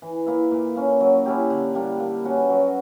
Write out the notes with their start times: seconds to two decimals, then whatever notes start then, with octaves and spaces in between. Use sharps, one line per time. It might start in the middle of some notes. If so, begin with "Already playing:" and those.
0.02 E3
0.26 A#3 E4
0.51 A#2
0.76 A#3 C#4
1.01 F#3
1.26 C#4 E4 G4
1.50 D3
1.75 G3 A#3 D4
2.00 A#3
2.25 C#4 F#4 B4
2.50 F#3